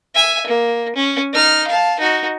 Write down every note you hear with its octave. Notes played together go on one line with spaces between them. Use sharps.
E5 G#5
A#3
C#4
D#4 F6
F5 A5
D#4 F#4